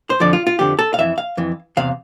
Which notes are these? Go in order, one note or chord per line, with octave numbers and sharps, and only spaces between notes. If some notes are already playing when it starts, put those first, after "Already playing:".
C5
F2 D3 F3 D5
F4
F4
F2 D3 F3 G4
A4
F5
F2 E3 E5
F5
F2 E3
E2 C3 F5